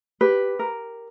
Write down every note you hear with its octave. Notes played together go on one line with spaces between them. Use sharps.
G4 B4
A#4